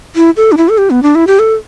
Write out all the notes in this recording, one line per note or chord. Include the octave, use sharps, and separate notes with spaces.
E4
A4
D4
E4
A4
G4
B3
D4
E4
G4
A4